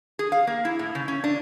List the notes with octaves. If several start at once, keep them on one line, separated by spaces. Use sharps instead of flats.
G#4
F5
A#3
E4
A2
C#3
C#4
D4